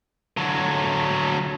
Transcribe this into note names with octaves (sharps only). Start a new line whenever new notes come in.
D3 F#3